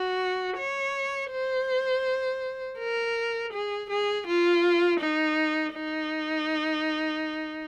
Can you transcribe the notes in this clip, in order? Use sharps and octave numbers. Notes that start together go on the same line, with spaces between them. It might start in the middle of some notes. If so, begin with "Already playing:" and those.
Already playing: F#4
C#5
C5
A#4
G#4
G#4
F4
D#4
D#4